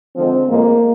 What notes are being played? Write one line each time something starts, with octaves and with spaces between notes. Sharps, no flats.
D3 F3 G#3 C4
A2 F3 G#3 A#3